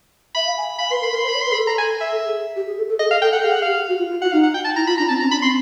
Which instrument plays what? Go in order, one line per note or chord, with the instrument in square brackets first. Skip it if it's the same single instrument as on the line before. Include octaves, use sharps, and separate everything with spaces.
[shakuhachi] E5 [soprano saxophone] B5
[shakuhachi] F5
G#5
[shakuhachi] F5 [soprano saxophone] B5
[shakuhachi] B4 [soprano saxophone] C6
[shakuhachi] A#4 [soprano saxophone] B5
[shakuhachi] A#4
[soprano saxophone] C6
[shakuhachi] C5
[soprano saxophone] B5
[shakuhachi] C#5
[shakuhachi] B4 [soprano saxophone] C6
[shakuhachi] G#4 [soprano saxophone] B5
[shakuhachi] A4
[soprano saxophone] A#5
G#5
E5
[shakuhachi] A4
G#4
G4
G#4
A4
A4
[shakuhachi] G#4 [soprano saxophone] D#5
[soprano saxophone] F5
[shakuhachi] A4 [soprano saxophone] G5
[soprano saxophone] F#5
[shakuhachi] G#4 [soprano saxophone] F5
[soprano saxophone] F#5
[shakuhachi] G4 [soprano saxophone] F5
[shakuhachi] F#4
F4
F4
[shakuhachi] F#4 [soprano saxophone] F#5
[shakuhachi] D#4 [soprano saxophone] F5
[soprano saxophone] F#5
G5
A5
[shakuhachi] E4 [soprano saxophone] A#5
[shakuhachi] F4 [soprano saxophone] B5
[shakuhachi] D4 [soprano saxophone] A#5
[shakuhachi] C4 [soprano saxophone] A5
[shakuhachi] C#4 [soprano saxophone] A#5
[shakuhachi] D4 [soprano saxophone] B5
[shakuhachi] C4 [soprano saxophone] C6